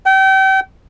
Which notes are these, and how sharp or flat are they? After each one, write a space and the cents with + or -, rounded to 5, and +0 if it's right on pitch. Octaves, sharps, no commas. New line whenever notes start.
G5 -35